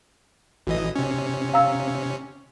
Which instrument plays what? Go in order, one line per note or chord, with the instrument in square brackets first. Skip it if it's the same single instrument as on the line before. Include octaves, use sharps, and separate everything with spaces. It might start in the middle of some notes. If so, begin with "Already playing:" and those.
[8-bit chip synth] A1 E3 D#5 [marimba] F#4
[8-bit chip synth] C3 C#4
[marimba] F5 A#5 E6